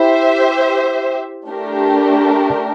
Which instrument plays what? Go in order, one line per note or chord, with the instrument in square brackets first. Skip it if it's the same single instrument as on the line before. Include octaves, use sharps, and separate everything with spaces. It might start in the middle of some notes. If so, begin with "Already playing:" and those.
Already playing: [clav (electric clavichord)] E4 [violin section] G4 C5 E5
[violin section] A3 D4 G4 A#4